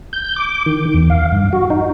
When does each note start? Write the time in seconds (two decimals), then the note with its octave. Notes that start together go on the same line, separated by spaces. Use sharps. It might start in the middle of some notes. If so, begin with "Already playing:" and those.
0.13 G6
0.36 D6
0.66 D#3
0.94 E2
1.10 F5
1.32 G2
1.53 F#4
1.70 D#4